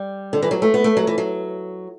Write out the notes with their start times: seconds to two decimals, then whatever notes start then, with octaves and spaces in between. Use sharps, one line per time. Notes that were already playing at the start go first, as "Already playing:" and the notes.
Already playing: G3
0.33 D3
0.43 E3
0.51 F#3
0.62 A3
0.74 B3
0.84 A3
0.97 F#3
1.07 E3
1.18 F#3